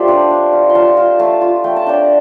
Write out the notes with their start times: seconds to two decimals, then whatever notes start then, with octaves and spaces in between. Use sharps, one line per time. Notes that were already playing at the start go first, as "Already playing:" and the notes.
Already playing: A3 F4 G4 C5 D5
0.08 D4
0.31 D4
0.52 F4
0.70 C6
0.75 F4 F5 A5
0.97 F4
1.19 A3 F5 A5
1.41 F4
1.64 A3 G5
1.76 A5
1.86 D4 D5 G5